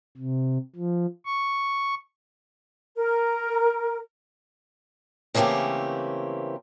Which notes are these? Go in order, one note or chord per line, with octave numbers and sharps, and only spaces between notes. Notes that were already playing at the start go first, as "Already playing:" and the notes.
C3
F3
C#6
A#4
C#3 E3 A3 A#3 C4 G4